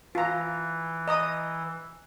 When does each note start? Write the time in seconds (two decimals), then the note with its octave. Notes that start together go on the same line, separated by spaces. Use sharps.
0.15 E3 F4 A#5
1.08 D#5 A#5 D#6